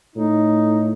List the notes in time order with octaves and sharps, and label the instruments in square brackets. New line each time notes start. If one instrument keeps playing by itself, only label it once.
[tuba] A2 [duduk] D#4